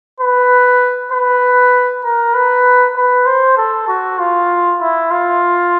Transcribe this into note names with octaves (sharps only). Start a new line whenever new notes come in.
B4
B4
A#4
B4
B4
C5
A4
F#4
F4
E4
F4